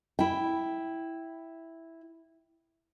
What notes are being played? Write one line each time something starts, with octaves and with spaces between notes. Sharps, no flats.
E4 G5